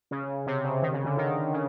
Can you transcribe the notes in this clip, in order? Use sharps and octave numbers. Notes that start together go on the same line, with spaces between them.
C#3
C3
C#3
D#3
C#3
D3
D#3
C#3